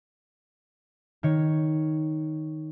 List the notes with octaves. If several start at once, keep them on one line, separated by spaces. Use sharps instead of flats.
D#3 C#5